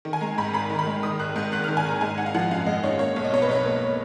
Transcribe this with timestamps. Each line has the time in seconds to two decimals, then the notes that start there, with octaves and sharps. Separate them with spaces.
0.05 D#3
0.13 G#5
0.21 G#3 A#5
0.38 G#2 B5
0.53 G#1 B5
0.70 D#3
0.79 B5
0.86 G#3
1.03 D#3 D#6
1.19 G#1 F#6
1.36 G#2 F#6
1.52 G#1 F#6
1.64 D#3 F6
1.77 G#5
1.85 G#1 A#5
2.01 G#3 G#5
2.18 D#4 F#5
2.26 F5
2.35 F3 F#5
2.50 F#2 F5
2.66 G#3 D#5
2.83 D#4 C#5
2.99 A#3 C#5
3.16 B1
3.24 D#5
3.32 B2 C#5
3.42 B4
3.49 B1 C#5
3.65 A#3